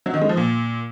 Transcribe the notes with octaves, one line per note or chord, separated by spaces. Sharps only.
F#3
D#3
G#3
F3
A#2